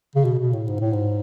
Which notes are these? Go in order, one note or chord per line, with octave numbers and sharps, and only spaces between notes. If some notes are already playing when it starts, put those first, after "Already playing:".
C#3
B2
B2
A2
G#2
A2
G#2